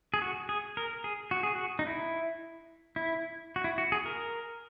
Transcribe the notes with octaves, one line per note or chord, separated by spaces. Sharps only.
G#4
F#4
G#4
A#4
G#4
F#4
G#4
F#4
D#4
E4
E4
F#4
E4
F#4
G#4
A#4